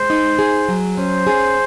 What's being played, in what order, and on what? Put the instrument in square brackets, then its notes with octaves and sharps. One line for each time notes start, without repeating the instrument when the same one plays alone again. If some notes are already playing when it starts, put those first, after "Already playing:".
Already playing: [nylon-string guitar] G#3 [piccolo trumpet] C5
[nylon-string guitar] D#4
G#4
F#3
[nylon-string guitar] C#4 [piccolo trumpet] C5
[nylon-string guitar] G#4